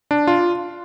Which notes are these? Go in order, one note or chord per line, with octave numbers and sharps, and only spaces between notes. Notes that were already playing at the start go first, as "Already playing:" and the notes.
D4
F4